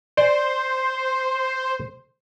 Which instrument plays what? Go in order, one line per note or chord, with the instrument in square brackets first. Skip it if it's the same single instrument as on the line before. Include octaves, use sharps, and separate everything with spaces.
[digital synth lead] C5 [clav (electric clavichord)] D5 G#5